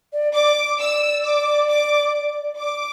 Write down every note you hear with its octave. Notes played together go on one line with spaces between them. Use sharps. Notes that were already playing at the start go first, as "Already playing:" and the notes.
D5
D5 D6
D5 E6
D6
D6
D6